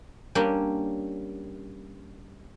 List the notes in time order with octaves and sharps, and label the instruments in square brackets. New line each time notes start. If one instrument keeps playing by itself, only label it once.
[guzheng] G3 A#3 C#4 D4